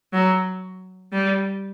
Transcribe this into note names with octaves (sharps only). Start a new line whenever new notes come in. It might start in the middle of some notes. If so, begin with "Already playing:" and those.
F#3
G3